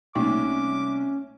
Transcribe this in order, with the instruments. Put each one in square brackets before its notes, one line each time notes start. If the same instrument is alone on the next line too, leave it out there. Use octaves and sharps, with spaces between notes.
[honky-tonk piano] C2 [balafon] A3 A#3 D#4 [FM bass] C#4 [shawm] D6